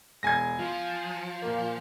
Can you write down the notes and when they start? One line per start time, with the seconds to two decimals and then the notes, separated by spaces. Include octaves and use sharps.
0.23 E1 G#5 G#6 A#6
0.59 F3 F4
1.42 A#2 A#3